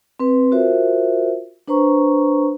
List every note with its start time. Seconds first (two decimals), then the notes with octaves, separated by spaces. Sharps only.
0.20 C4 B4
0.52 F4 F#4 A#4 C5 E5
1.68 D4 B4 C5 A#5 C#6